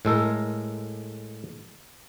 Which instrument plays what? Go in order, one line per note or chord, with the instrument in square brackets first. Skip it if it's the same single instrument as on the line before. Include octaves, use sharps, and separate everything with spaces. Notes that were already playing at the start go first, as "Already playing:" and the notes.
[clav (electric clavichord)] A2 G#3 A4 A#4